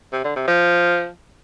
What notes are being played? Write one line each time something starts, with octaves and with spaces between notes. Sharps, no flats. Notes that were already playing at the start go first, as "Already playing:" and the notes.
C3
D3
C3
F3